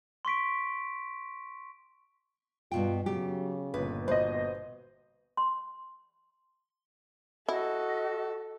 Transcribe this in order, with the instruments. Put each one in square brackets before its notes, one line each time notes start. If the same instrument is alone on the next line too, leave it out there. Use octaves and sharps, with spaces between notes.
[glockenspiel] C6 C#6 B6 D7
[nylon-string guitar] G2 B2 G5 [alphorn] F4
[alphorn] C#3 [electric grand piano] F#3 [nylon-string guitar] G4
[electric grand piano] G1 A#2 [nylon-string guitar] B4
[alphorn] B2 [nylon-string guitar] B4 [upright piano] C5 D#5
[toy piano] C6
[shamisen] E4 [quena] F#4 [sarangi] A4 [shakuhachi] D#5